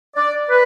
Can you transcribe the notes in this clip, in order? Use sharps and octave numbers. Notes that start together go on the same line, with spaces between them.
D5
B4